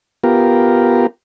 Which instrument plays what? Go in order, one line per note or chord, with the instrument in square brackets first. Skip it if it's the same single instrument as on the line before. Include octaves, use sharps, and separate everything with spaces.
[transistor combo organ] B3 F4 G4 A#4